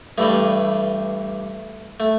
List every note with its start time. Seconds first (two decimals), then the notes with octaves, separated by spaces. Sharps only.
0.18 G2 E3 G3 A3
2.00 A3